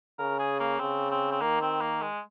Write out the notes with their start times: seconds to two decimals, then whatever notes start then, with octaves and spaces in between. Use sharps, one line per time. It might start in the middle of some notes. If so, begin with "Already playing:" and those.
0.19 C#3 A#4
0.39 G#4
0.59 A#3
0.80 C#3 C4
1.11 C4
1.31 C4
1.41 D#3 A#3
1.61 C4
1.81 A#3
2.01 G#3